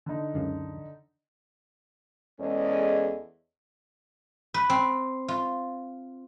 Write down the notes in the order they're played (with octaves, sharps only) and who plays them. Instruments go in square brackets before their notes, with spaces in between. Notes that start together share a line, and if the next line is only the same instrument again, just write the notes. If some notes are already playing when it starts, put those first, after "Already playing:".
[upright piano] D3 D#4
[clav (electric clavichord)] C#2 F#2 C#3
[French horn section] E2 G#3 C#4 A4 D5 D#5
[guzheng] B4
C4
F4